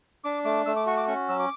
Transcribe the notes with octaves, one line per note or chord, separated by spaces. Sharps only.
D4 D6
A3 D6
A3 E6
D6
F#4 C#6
D6
C#4 C#6
F#3 E6
D6